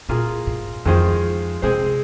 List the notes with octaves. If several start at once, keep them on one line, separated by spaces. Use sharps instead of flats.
A#2 A#3 F4 G#4
G#2
F2 D#3 G#3 F4 G#4 C5
C3 G#3 C4 G#4 C5